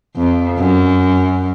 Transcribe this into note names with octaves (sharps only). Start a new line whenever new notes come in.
F2
F#2